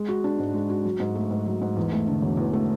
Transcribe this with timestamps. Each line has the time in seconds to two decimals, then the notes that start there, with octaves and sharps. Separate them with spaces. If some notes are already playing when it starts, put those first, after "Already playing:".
Already playing: G#3
0.08 F#4
0.24 D4
0.39 G#2
0.54 G#3
0.70 F#4
0.85 F#3
1.00 G#2
1.15 A3
1.31 G#2
1.46 F#3
1.61 G#2
1.76 E2
1.92 A3
2.07 D3
2.22 E1
2.37 E2
2.53 A3